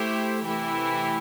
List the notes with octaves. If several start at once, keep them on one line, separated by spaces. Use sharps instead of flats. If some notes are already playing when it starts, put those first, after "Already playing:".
Already playing: A3 E4 G4 C5
C3 E3 A3 E4 G4